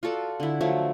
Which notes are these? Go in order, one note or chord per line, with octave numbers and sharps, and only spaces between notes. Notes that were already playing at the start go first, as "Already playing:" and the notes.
F4 F#4 A4 D5
D3 E4
F3 F#3 A3